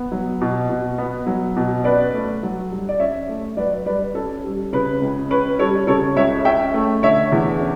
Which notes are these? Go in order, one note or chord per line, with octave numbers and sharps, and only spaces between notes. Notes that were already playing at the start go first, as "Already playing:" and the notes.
Already playing: B3
F#3
B2
B2
B3
F#3
B2
C#4 B4 D5
A3
F#3
G2
D5
C#4 C#5 E5
A3
F#3 B4 D5
G2 B4 D5
C#4 A4 C#5
G3
C#3 B4
C#2
C#4 B4
G3 A4 C#5
C#3 A4 C#5
C#2 C#5 E5
C#4 E5 G5
A3
D3 C#5 E5
E2
C#4